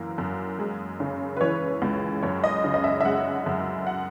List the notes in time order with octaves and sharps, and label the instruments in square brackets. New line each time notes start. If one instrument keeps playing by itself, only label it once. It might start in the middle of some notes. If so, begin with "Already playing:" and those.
Already playing: [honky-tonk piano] F#2 E3 A#3
F#2
G#3
C#3
B4
E3 C#5
C#2
F#2 C#5
D#5
C#3
D#5
E5
E5
G#3 F#5
F#2
F#5